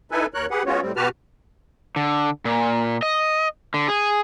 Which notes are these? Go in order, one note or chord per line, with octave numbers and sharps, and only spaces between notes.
D#4 E4 A4 B4 G#5
D#2 A#4 C#5 F#6
G4 G#4 B4 F#5
G#3 B3 C#4 F4 F#4 C#5
A2 G3 C4
B2 F#4 G4 B4 A5 F6
D3
A#2
D#5
D3
G#4